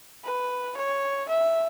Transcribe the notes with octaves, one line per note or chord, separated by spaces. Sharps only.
B4
C#5
E5